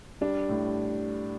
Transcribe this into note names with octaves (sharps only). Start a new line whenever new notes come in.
G3 D4
A2